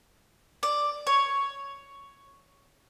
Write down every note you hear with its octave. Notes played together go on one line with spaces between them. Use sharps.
D5
C#5